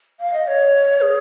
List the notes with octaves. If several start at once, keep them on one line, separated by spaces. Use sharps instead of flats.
F5
D#5
C#5
G#4